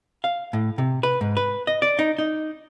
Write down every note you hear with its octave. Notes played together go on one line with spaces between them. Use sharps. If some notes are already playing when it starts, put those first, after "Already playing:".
F5
A2
C3
B4
G#2
B4
D#5
D5
D#4
D#4